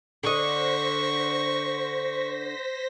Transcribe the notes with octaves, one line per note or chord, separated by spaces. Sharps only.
D3 C5 D#5 C#6 A#6 B6